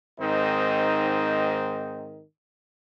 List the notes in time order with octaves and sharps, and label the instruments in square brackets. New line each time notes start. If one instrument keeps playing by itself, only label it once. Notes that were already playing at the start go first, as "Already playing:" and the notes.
[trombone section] G#2 D#3 C4 D#4